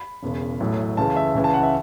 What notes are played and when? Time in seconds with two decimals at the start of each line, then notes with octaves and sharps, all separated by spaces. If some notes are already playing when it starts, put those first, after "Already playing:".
Already playing: B5
0.22 E1 E2 C#3
0.60 A1 A2 F#3
0.97 C#2 C#3 E3 A5
1.16 E5
1.35 C#2 C#3 E3
1.44 A5
1.54 F#5
1.63 E5